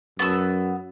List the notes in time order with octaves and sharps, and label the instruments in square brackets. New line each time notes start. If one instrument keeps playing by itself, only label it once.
[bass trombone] F#2 [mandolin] B3 E6